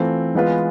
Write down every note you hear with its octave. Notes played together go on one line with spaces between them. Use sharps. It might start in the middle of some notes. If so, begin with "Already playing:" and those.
Already playing: E3 A3 C4 F4
E3 G#3 B3 F4 B4